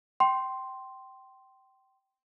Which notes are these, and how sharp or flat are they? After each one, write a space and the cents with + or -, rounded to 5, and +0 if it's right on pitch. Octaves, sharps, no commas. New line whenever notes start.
G5 -20 C6 +0